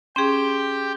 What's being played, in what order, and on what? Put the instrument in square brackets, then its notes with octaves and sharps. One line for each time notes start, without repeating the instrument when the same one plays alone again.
[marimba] C#4 G#4 [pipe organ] G4 G5 [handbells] C6